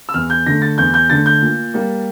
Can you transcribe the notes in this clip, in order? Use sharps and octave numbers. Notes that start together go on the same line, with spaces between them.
E6
E2 F6
G6
D3 A3 A#6
A6
E2 G6
G6
D3 A3 A6
G6
A#2
G3 A#3